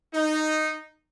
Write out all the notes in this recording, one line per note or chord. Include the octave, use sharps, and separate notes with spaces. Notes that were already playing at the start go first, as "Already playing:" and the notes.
D#4